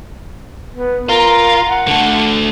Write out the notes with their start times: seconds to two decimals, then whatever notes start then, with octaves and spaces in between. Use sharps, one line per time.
0.75 B3
1.09 F4 A#4
1.66 F#5
1.88 D3 A3